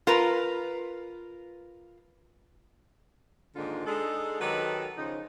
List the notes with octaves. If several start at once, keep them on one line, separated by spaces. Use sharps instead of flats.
F4 A#4 B4 A#5
G#2 D3 D#3 A#3 D4 F4
G#3 D4 D#4 G#4 A4
D#3 F#3 G4 A4 B4 D#5
C#3 F3 D#4